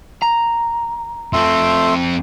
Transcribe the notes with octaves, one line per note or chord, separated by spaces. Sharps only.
A#5
F2 A3 C4 E5 C6